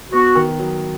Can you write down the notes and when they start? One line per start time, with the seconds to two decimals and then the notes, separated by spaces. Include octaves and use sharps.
0.12 B3 F#4
0.35 D#3
0.59 F#3